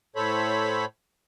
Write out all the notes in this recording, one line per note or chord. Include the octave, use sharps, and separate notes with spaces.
A2 A4 C5 C#5 B5